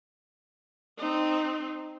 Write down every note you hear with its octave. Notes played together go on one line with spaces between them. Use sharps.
C4 D#4